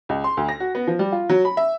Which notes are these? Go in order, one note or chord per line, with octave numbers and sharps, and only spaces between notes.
C#2
C6
D2
A#6
F#4
B3
F3
G3
F4
F#3
B5
E5